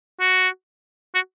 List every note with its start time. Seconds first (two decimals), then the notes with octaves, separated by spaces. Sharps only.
0.20 F#4
1.15 F#4